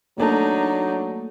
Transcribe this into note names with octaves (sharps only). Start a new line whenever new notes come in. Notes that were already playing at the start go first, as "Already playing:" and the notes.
F#3 A3 A#3 D4 D#4 A4